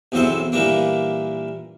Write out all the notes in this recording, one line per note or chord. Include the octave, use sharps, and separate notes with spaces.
B1 E2 C3 C4 A4 C5
A#2 E3 G3 A#3 D4